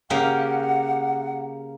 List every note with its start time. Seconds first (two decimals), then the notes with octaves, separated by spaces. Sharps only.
0.10 C#3 A#3 G4 F#5